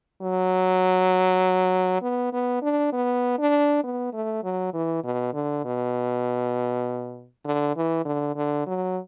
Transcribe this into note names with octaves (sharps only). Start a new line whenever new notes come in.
F#3
B3
B3
D4
B3
D4
B3
A3
F#3
E3
B2
D3
B2
D3
E3
D3
D3
F#3